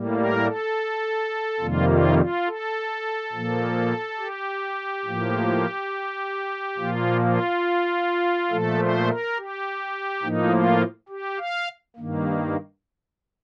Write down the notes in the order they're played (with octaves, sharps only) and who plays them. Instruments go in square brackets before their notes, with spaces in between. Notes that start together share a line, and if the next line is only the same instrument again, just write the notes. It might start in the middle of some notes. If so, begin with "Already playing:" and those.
Already playing: [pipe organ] A2 G3 A#3
A#4
A4
F2 C3 D#3 G3 A#3 F4
F4
F4
A4
A#2 F3 A#3
G4
A2 F3 A#3
A#2 F3 A#3 F4
F4
A#2 F3 A3 A4
C5
A#4
G4
A2 F3 A#3 D#4
F4
G4
F5
G2 D#3 A#3